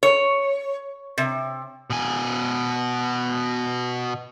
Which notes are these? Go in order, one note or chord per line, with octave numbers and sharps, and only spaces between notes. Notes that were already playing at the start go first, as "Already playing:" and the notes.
C#5
C3
B2 G#5